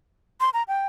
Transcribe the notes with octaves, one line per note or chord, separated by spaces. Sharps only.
C6
A#5
G5